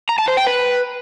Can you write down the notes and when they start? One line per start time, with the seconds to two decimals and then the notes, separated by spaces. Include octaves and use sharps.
0.09 A#5
0.18 A5
0.28 C5
0.37 G5
0.47 B4